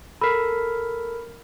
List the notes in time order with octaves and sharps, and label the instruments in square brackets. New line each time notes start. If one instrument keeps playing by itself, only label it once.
[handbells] A4 A#4 [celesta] B5 B6